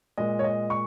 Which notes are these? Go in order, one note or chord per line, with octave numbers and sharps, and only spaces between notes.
A#2 G#3 D#5
C#5
D#5
C#6